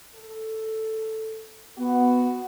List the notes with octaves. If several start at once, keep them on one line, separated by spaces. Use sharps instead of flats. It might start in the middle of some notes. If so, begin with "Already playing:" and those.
A4
B3 F#4